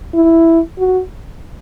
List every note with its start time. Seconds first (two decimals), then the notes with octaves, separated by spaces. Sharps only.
0.15 E4
0.78 F#4